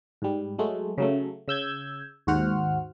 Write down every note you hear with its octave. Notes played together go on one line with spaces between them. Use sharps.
G#2 G3
F#3 G#3 A3
C#3 F#3 A3
C#3 E6 G6 G#6
D#2 G#2 F#4 C5 F#5 F6